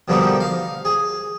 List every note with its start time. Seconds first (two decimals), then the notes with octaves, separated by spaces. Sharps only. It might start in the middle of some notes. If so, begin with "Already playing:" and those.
0.08 B2 D3 F3 G3 A#3 D#4
0.40 F5
0.85 G#4